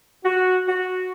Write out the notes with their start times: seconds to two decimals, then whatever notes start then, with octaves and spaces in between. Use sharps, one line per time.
0.24 F#4
0.67 F#4